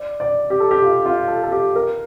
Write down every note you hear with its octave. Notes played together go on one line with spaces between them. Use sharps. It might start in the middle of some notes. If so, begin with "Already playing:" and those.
Already playing: D5
D5
G4
A4
G4
F4
F4
A4
A4
G4
A#4